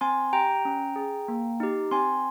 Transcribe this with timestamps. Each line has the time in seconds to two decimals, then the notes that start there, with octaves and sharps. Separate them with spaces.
0.01 C4 G#5 C6
0.33 G4 G5 A#5
0.65 C#4
0.96 G#4
1.28 A#3
1.60 D#4 G4
1.91 C4 G#5 C6